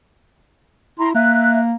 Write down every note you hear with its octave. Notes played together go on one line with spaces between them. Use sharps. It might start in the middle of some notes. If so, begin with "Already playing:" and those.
E4 A#5 C6
A#3 E5 F#6